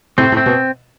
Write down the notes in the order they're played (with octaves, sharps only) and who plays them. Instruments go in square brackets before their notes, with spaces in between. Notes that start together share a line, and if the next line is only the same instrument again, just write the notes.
[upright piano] A2 C3 [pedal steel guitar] C4
[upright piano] A2
[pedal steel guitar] C4
[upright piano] B2